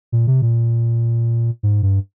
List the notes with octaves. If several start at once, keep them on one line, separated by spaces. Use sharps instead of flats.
A#2
C3
A#2
G#2
G2